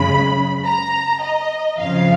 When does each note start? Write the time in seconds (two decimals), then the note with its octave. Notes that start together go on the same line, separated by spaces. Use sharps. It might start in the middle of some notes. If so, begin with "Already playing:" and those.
Already playing: F#2 C#3 G#3 B5
0.65 A#5
1.23 D#5
1.80 F2 C#3 F3 F5